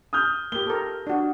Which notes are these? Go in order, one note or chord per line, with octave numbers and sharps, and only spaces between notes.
D#6 F6 G6
A#3 G4 G7
A4 A#4
D4 F#4